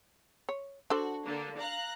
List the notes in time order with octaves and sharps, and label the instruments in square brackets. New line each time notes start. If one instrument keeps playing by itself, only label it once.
[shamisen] C#5
[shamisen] D4 A4 C5 [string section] F#4
[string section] D3 A#3
F5 A#5 F#6